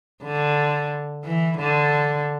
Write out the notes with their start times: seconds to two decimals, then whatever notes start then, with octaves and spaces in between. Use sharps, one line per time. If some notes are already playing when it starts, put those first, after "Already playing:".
0.24 D3
1.24 E3
1.59 D3